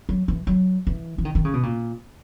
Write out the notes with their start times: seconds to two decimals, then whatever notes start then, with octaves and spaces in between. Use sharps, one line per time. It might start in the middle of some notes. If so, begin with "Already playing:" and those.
0.09 F#3
0.28 E3
0.47 F#3
0.87 E3
1.18 E3
1.25 D#3
1.35 D#3
1.45 C#3
1.54 B2
1.63 A#2